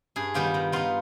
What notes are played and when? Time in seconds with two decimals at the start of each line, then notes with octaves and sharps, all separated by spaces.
0.16 G2 G#4
0.34 D#3 G3 B3 F4 G4
0.54 D#3
0.72 B3 D#4 F4